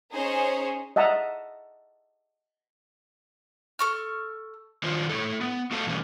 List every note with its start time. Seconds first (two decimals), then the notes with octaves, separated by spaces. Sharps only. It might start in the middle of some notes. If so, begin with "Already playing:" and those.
0.11 C#4 D#4 G#4 C5 C#5
0.96 D#5 E5 F#5 A5 A#5
3.79 A4 C#6 F6
4.83 D#3 F#3 D4 F4 C5
5.09 A3 E4 A4
5.41 B3
5.71 A3 F#4 A4 F5 A5
5.87 B2 E3 G3 A3 C#4